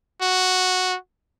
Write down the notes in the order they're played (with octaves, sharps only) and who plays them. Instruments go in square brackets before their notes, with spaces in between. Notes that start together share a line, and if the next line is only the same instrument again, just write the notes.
[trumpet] F#4